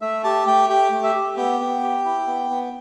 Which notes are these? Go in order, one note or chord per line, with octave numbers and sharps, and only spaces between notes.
A3 E5
G4 A5
A3 G5
G4 G5
A3
E5
G4
B3 G5
B3
G4
E4
B3
B3